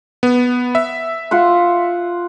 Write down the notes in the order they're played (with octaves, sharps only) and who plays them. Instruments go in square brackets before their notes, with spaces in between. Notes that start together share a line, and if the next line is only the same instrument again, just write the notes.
[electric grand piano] B3
E5
[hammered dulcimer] F4 F#5 C6